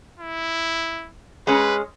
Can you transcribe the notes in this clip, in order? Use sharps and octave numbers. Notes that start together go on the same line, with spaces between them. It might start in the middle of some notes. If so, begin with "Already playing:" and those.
E4
G#3 C#4 B4